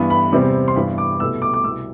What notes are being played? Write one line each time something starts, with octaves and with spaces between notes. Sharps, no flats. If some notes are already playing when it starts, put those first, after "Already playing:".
Already playing: G2 E3 B3
B5
E2 C3 G3 C4
C6
G2 E3 B3 B5
D6
C2 B2 A3 E6
D6
D6
C2 B2 B3 E6